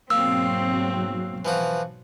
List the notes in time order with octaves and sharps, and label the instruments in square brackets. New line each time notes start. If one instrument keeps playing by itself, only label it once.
[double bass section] G#2 B2 F#3 [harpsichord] A#3 [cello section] C4 [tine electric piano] E6
[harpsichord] E3 F3 F#4